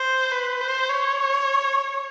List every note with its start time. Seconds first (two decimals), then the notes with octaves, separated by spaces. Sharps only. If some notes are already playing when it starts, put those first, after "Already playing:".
Already playing: C5
0.32 B4
0.61 C5
0.89 C#5